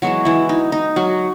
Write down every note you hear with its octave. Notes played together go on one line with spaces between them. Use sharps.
E3 F#3 G#3 B3 F#4
E3 E4
D#4
D#4
F#3 F#4